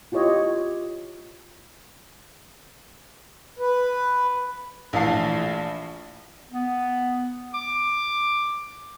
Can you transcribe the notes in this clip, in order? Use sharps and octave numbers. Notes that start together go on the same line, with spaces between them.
E4 F4 G4 C#5 D#5
B4
A#1 A2 E3 F5 A5 C7
B3
D6